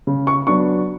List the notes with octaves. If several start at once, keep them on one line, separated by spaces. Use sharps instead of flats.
C#3
C#6
F#3 B3 D4 C#6